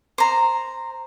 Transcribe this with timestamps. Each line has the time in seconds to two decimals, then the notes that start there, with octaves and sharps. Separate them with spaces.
0.18 C5 A#5